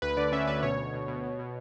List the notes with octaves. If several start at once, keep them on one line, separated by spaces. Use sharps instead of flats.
D2 B4
D3 D5
C#4 E5
D2 B4
B2 C#5
B2
B2
B2
B2
B2